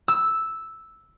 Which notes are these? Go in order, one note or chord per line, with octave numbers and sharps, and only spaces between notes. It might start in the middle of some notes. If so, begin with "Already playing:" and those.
E6